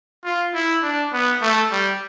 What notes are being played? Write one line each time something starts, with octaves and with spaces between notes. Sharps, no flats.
F4
E4
D4
B3
A3
G3